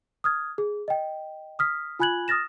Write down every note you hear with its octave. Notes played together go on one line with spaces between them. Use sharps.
D#6 F6 G#6
G#4
D#5 G5
D#6 F6 B6
F4 G#5 B5 F#6 G#6 F#7
D#6 F6 A6 A#6 E7